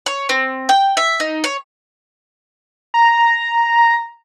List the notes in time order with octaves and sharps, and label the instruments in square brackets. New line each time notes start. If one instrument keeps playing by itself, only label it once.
[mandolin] C#5
C4
G5
E5
D#4
C#5
[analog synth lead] A#5